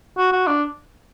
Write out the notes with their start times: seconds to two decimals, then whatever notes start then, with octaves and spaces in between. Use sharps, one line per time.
0.18 F#4
0.33 F#4
0.48 D4